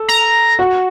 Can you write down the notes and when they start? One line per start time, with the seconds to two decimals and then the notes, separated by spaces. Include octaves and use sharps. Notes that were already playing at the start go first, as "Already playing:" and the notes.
Already playing: A4
0.08 A#5
0.59 F#4